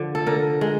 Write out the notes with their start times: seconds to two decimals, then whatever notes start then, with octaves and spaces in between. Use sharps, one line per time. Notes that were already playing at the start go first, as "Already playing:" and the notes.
Already playing: D3 F3
0.15 A4
0.27 D3 A#4
0.61 G#3